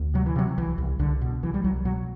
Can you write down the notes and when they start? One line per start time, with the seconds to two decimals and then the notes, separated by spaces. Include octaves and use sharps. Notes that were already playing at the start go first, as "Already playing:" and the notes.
Already playing: D2
0.14 C3 F#3
0.26 E3
0.36 C3 F#3
0.58 C2 E3
0.78 C2
0.99 C2 D3
1.21 B2
1.43 C2 E3
1.54 G3
1.63 C2 F#3
1.85 B2 F#3